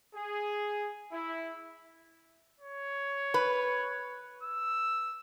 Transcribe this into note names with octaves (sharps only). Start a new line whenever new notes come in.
G#4
E4
C#5
B4
E6